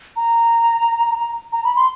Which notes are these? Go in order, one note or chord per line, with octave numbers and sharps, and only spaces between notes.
A#5
A#5
B5
C6